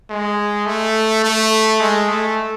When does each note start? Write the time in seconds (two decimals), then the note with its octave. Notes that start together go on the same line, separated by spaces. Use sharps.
0.10 G#3
0.66 A3
1.24 A3
1.81 G#3
2.09 A3